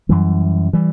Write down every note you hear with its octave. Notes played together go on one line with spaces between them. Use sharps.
F#2 E3 G3
E3 G3